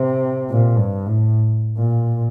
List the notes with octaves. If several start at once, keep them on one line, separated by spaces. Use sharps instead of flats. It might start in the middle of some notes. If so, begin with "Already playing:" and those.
Already playing: C3
A#2
G2
A2
A#2